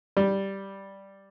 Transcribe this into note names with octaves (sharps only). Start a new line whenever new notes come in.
G3